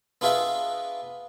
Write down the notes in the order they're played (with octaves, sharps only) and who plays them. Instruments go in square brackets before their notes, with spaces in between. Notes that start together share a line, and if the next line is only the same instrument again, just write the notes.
[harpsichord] B3 D4 F4 G#4 D#5 E5